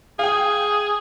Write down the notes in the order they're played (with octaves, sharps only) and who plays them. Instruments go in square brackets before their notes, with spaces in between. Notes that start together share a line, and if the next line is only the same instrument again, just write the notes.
[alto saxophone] G#4 [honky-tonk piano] F5 G5